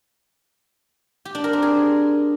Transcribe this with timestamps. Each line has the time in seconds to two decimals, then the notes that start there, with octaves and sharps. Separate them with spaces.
1.25 G4
1.35 D4
1.44 A#4
1.53 C4
1.62 G#4